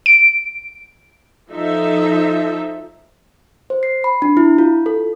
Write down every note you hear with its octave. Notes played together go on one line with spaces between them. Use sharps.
D7
F3 D#4 A4 E5
C5
C7
B5
D4
E4
F4
A4